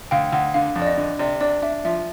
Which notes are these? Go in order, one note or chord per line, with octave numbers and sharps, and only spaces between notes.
D2 F5 G5
D2 F#5
D3 F5
F2
D5
D#5
D3
C3 D5
D4 D5
D4 E5
F3 E5